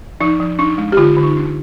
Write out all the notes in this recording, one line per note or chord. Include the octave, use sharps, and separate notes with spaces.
F3 D#4
F3
D4 D#4
G#3
G4
D3 F4
D3
D#4
D4